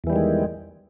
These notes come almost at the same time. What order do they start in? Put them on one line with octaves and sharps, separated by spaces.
E2 E3 G3 D#3 G#3